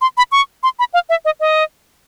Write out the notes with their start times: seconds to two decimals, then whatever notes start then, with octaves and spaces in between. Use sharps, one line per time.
0.01 C6
0.18 B5
0.32 C#6
0.63 C6
0.79 B5
0.94 F5
1.09 E5
1.25 D#5
1.40 D#5